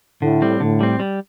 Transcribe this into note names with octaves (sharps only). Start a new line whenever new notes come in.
A2 D3
G3 C4
A2 D3
G3 C4
G3